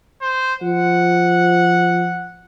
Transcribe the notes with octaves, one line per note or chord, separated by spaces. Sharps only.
C5
F3 F#5